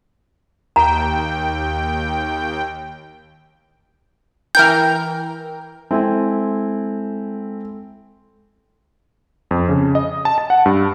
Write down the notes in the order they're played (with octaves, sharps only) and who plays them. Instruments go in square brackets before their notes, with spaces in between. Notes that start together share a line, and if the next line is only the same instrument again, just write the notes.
[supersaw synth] D#2 G5 [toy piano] A#5
[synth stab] E3 A#4 G5 [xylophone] F6 G6
[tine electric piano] G#3 A4 G#5 [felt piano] C4 E4
[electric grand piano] F2
C#3
D#5
A5
A5
F#5
G2